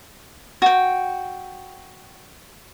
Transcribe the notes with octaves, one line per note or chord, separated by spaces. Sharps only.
F#4 G5